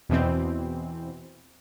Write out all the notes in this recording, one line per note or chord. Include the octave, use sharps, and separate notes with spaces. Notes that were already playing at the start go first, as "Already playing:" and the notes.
E2 B2 E3 C4